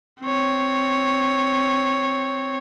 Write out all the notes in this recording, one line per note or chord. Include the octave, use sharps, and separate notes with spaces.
C4 C#5